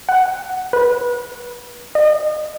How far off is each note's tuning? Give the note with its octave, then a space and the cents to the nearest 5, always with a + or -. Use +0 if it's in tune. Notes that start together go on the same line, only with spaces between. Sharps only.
F#5 +5
B4 -25
D#5 -35